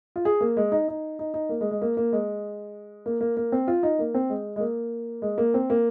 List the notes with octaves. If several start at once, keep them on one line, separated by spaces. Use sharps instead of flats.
F4
G#4
A#3
G#3
D#4
D#4
D#4
D#4
A#3
G#3
G#3
A#3
A#3
G#3
A#3
A#3
A#3
C4
F4
D#4
A#3
C4
G#3
G#3
A#3
G#3
A#3
C4
A#3